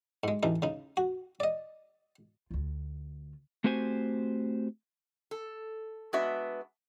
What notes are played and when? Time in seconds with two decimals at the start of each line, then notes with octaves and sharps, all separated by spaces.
0.24 G#2 G#3
0.43 A1 E3 D#4
0.62 C#3 D#4
0.97 F#4
1.40 D5 D#5
2.51 D2 F4
3.64 A3 C4 F#4 G4 C5 G#5
5.31 A4
6.13 G#3 B3 D4 F#4 E5